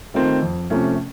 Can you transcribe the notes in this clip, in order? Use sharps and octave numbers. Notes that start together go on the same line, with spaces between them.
D#3 A3 C4 F4
F2
C3 F3 A3 C#4